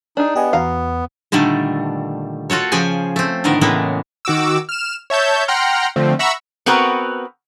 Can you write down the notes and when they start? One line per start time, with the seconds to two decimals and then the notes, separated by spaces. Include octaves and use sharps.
0.17 D4 D#4 G#4
0.35 B3 G4 D#5 G#5
0.53 E2 F#4 F5 A#5
1.32 A#2 D3 D#3 G3 A3
2.50 F4 F#4 A4 C#5
2.72 C#3 F3 G#4 G5 G#5
3.16 A3 C4
3.44 A2 D3 D#3 B3 A#4
3.61 A2 C#3 E3 G#3 A#3 B3
4.25 D#3 F#4 D6 E6
4.69 F6 E7
5.10 C#5 E5 A5 G6
5.48 F#5 G5 A#5 C6 F6
5.96 D3 F3 A3 C4
6.19 E5 F#5 A#5 B5 C#6 E6
6.66 B3 C4 F#4 A#4 B4